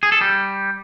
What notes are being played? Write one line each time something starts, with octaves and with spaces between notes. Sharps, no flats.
G#4
A4
G3